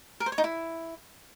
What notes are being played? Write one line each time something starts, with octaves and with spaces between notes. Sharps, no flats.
A#4
C5
C#5
D#4
E4